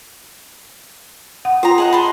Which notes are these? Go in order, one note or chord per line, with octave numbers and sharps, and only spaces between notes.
F#5
F4 C5 G5 A#5
G#4 D#5 F#5
A5 B5 C6